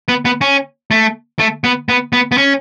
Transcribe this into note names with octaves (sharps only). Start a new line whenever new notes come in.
B3
B3
C#4
A3
A3
B3
B3
B3
B3
C#4